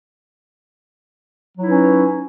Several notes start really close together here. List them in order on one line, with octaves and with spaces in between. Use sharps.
F#3 E4 D#4 B4 C#4